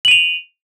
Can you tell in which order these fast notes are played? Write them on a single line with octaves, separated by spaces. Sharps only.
F#7 D#7 F7